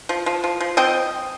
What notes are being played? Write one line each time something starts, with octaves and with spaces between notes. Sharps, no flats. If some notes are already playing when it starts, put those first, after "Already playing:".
F3
F3
F3
F3
C4 D#5 G5